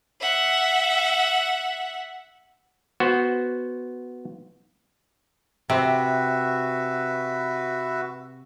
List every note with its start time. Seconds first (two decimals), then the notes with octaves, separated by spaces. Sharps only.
0.20 E5 F#5
3.00 B3 F#4 C5
5.70 C3 F#4 B4 E5